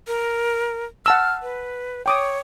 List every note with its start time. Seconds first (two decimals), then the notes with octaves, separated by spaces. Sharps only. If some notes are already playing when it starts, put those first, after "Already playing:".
0.07 A#4
1.06 F#5 A5 E6 F6
1.42 B4
2.06 C#5 G5 D6 D#6